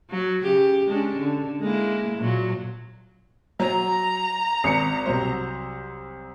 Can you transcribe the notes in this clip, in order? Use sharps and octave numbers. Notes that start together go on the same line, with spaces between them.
F#3
C#3 G4
G#3 C#4 D4
D3
G#3 A#3 E4
A#2 F#3
F#3 A#5
G#1 C#7
C2 F#3 C5